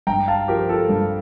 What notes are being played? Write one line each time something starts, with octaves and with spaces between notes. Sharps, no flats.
G2 G5 A#5
F5 A5
F3 G4 A#4
F4 A4
G2